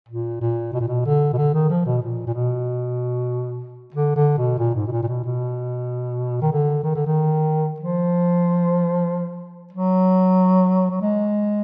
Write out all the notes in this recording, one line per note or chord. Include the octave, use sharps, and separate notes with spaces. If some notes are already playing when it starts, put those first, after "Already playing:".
A#2
A#2
B2
A#2
B2
D3
B2
D3
D#3
F3
B2
A#2
A#2
B2
D3
D3
B2
A#2
G#2
B2
A#2
A#2
B2
B2
D#3
D3
D#3
D3
D#3
F3
F#3
F#3
G#3